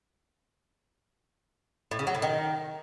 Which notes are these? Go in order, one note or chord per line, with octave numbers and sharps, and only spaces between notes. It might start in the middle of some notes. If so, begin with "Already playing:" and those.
A2
C#3
F#3
A2
D#3